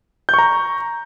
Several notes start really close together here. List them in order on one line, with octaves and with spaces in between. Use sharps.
G6 C#6 A#5